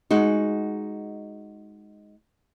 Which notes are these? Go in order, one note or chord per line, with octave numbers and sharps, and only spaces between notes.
G#3 D#4 F#4